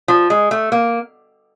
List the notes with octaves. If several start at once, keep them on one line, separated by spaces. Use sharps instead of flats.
F3
G#3
A3
A#3